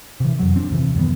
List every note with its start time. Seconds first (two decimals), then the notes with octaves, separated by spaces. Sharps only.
0.20 C3 E3
0.39 F2 F#3
0.56 C4 D4
0.70 D#2 C3 E3
0.95 C#2 F#2 D#3 B3